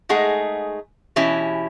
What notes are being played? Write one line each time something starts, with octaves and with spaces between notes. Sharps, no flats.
G#3 A3 D#4 G#4 F#5
B2 E3 C#4 E4 G4